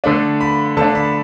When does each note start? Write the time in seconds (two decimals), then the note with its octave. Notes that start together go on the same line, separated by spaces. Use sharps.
0.04 D3 A3 D4
0.41 B5
0.77 D3 A3 D4 A5
0.95 B5